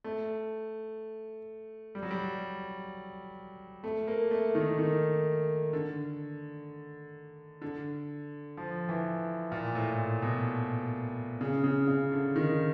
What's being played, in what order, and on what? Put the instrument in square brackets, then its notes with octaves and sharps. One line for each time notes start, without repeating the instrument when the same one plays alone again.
[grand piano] A3
G3
F#3
G3
A3
A#3
A3
D#3
D#3
D3
D3
F3
E3
A#2
A2
A#2
B2
C#3
C#3
C#3
D3
D#3